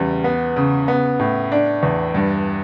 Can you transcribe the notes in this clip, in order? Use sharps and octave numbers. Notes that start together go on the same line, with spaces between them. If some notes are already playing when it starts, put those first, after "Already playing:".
Already playing: E2 C#3 G3
B3
C#3
B3
A2
D4
E2
G2